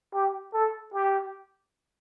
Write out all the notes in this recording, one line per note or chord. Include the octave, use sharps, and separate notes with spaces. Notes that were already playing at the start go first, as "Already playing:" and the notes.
G4
A4
G4